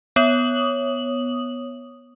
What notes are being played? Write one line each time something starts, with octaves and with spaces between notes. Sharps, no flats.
B3 C#5 D#6 F#7